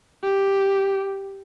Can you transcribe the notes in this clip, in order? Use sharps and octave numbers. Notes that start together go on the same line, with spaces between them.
G4